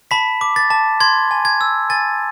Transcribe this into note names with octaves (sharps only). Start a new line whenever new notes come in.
A5 B5 B6
D6
A6
A5
C6 G#6
G#5
G#6
E6
G#5 A6